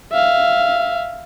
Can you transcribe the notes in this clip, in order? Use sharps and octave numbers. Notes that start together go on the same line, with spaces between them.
E5 F5